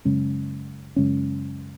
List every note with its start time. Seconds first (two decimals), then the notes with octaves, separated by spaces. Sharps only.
0.05 F#2 C#3 G#3 C#4
0.96 F#2 C#3 G#3 C#4